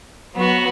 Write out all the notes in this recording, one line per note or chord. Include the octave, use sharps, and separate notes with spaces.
F#3 B3 F#4